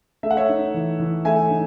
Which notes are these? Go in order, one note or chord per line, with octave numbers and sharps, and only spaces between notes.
A3 E5
F#5
C#5 E5
D#4
E3
E3
A3 E5 G#5
D#4